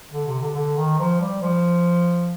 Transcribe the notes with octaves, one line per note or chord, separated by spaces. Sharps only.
D3
C3
D3
D3
D#3
F3
G3
F3